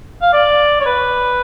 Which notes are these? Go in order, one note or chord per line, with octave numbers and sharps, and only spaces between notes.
F5
D5
C#5
B4